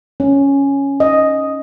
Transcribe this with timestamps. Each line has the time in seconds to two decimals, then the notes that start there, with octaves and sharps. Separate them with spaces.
0.20 C#4
1.00 D#5